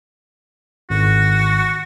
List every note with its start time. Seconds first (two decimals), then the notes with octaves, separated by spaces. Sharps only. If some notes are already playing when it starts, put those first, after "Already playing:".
0.90 G#1 F#4